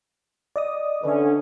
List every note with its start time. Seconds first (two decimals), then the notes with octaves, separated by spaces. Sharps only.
0.56 D5 D#5 D#6
1.04 D3 C#4 D4 B4 E5